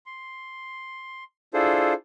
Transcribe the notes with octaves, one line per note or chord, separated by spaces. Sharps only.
C6
D4 E4 F4 G#4 A4 C5